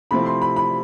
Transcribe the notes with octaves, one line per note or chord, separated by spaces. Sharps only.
C3 F3 A3 C4 E4 B5
C6
B5
B5